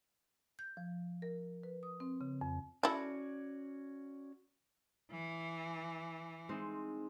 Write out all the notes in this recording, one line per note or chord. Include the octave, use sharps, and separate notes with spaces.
G6
F3
A#4
B4
D#6
C4
C#3
F2
C#4 E4 F#4 A4 D5
E3
G#3 C4 D#4